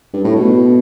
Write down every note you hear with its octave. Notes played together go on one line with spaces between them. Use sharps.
G2
A2
B2